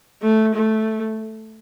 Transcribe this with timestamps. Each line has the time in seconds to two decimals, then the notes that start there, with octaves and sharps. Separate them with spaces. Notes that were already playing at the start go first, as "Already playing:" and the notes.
0.22 A3
0.55 A3